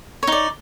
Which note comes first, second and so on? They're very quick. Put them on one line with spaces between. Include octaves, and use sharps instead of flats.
C#5 D#4 D5